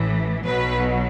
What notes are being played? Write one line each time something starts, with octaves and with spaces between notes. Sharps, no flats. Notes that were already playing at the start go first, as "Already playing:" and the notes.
Already playing: A1 A2 E3
B1 B2 F#3 B4